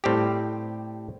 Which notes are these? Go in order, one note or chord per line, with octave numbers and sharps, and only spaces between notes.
A2 G3 C4 G4